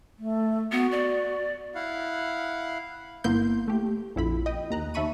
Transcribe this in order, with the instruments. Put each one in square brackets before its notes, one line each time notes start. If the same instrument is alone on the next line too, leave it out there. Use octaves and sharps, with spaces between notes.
[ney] A3
[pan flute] B3 [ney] F#4
[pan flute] D5
[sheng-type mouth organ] E4 F5 F#5
[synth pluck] G1 A#3 B3 E4 C6 G6
A3 G4
A#1 F2 E4 F4 B5
D#5 G5
D#2 A#5 F#6
D#2 E5 A5 B5 C#6 D#7